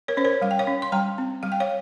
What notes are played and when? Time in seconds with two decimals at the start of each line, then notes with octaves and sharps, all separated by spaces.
0.08 A#4 C#5
0.17 C#4 C5
0.25 A#4 C#5
0.41 G3 F5
0.51 G5
0.59 C#5 F5
0.67 C#4
0.82 C6
0.92 G3 G5 A#5
1.18 C4
1.43 G3 F5
1.52 G5
1.60 C#5 F5